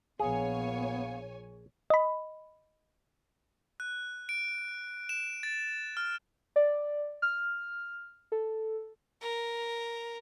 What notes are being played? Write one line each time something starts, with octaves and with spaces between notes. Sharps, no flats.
A#1 B3 G#4 C#5 F5 G#5
D#5 B5
F#6
D7
E7
A6
F6
D5
F6
A4
A#4